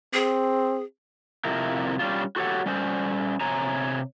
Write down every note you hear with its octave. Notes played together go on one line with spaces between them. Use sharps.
C4 G#4
F2 C3 F3 E4 G4 A#4
G3 C#4 D4 F4
F#4 G4 A4 C#5 F#5
G3 C#4 C5
C3 C#5 G#5 A#5